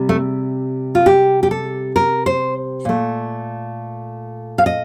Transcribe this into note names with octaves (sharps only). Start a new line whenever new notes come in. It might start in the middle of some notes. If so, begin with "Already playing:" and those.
Already playing: C3 G3
A3
F4
G4
G4
A4
A#4
C5
A#2 A3
F5
D#5